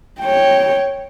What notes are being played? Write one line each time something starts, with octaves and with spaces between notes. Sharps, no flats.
C#5 G5